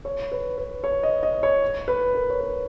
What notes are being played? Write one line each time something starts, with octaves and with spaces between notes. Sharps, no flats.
C#5
B4
B4
C#5
D#5
D#5
C#5
B4
A#4
C#5
B4